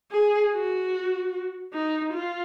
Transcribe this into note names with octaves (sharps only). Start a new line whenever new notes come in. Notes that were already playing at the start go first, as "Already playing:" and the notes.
G#4
F#4
D#4
F4